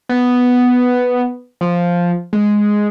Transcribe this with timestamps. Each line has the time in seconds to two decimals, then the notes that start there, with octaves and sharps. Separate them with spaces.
0.09 B3
1.61 F3
2.33 G#3